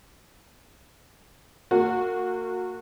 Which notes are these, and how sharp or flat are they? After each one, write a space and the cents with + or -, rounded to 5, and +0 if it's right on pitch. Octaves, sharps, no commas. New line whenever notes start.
A#3 -35 F#4 -15